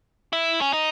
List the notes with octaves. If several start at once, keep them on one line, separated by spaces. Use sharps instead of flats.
E4
C#4
D#4